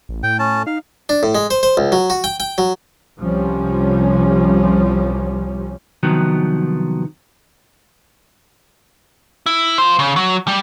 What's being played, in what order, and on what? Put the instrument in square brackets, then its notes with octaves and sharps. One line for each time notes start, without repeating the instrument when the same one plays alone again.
[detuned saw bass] A1
[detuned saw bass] A2 [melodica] G5
[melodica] C#4 A5
[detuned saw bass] D#4 [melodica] F5
[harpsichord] D4
A2
G#3
C5
C5
C#2
F#3
F#4
G5
G5
F#3
[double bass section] C2 C3 F3 G3 C#4
[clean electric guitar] C2 D#3 F3 F#3 B3
[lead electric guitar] E4
F4 C5
C#3
F#3
G3